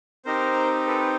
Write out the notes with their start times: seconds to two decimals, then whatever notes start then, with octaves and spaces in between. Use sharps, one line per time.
0.25 C4 D#4 G4 A#4 C5
0.87 A4 B4
1.00 B4